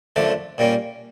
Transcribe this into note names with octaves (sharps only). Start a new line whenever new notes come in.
F#2 D3 F3 A3 D5
A#2 G3 A#3 C#4